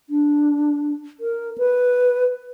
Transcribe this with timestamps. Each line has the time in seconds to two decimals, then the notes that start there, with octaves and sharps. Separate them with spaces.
0.10 D4
1.20 A#4
1.58 B4